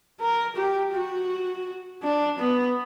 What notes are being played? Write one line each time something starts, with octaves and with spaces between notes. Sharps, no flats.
A#4
G4
F#4
D4
B3